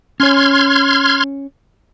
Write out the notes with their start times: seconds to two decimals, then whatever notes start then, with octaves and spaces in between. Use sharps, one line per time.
0.20 C#4 C#5 C6 F6 G#6